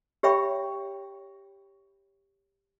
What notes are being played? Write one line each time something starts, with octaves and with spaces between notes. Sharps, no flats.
G4 C#5 E5 G5 B5 C#6